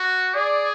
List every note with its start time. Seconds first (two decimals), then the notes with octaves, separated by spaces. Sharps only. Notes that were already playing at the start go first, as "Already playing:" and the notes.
Already playing: F#4
0.35 G#4 D5